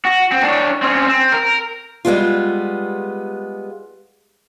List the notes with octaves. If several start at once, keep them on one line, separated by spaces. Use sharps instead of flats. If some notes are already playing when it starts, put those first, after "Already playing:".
F#4
C4
D4 C#5
C4 C#4
C4
A#4
G3 G#3 B3 F4